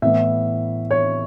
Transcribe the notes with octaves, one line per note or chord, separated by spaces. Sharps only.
A2 E3 B3 E5
C#5